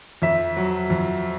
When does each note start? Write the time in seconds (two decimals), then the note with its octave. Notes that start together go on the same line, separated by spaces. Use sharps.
0.22 F2 E5
0.57 F#3
0.90 F2